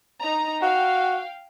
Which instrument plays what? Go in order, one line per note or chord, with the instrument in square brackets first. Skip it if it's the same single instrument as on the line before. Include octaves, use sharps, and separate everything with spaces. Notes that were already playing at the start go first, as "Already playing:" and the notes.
[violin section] D#4 A#5
[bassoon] F#4 [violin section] F5 G5